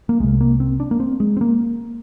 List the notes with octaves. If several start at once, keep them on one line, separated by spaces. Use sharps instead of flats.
A#3
C2 C3 G#3
A#3
C4
D4
A#3
C4
G#3
C4
A#3